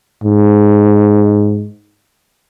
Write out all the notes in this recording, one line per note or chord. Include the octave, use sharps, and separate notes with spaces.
G#2